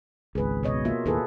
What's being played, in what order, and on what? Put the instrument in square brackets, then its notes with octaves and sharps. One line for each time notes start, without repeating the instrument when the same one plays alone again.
[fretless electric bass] G#1 C#2 [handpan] G#4 B4
[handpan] B2 C#5 D#5
A#3 F4 E5
[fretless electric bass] D#2 A2 [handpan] G#4 A4 B4